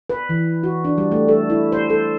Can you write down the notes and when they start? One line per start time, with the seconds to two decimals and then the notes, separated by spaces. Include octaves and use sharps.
0.10 B4
0.29 E3
0.63 F#4
0.84 D4
0.98 G3
1.12 A3
1.28 A4
1.50 E4
1.72 C5
1.90 A4